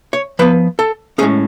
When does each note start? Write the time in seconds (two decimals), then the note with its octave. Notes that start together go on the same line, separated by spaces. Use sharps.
0.13 C#5
0.39 F3 B3 B4
0.79 A4
1.18 C#4 G#4
1.21 A2 G#3